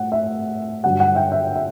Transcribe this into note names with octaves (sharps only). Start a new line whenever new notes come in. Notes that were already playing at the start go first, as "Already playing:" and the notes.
Already playing: A2 F#5
E5
G2 D3 F#3 F#5
F#5
E5 G5
E5
E5